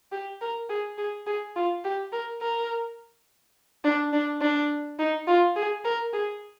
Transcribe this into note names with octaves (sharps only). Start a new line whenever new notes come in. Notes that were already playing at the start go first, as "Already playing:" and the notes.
G4
A#4
G#4
G#4
G#4
F4
G4
A#4
A#4
D4
D4
D4
D#4
F4
G#4
A#4
G#4